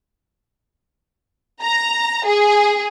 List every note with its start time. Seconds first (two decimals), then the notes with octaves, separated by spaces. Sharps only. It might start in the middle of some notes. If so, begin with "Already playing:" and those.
1.62 A#5
2.26 G#4